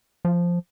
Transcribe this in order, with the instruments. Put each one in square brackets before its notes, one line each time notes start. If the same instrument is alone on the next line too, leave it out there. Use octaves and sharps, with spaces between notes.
[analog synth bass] F3